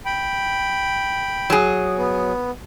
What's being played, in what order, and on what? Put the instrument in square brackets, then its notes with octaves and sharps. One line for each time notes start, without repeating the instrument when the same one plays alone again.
[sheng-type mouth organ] G5 B5
[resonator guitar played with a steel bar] F#3 G#4
[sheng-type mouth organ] B3